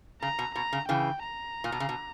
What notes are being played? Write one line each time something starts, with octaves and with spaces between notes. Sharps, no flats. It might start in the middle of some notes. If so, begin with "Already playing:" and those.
C#3 A#5
B2
B2 A#5
C#3
C#3 E3 G5
A#5
A#2
B2
C#3
B2